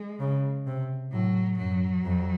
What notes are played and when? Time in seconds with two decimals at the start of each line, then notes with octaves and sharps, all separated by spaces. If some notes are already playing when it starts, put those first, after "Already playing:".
Already playing: G#3
0.20 C#3
0.66 C3
1.12 A2 F#3
1.58 F#2 F#3
2.05 F2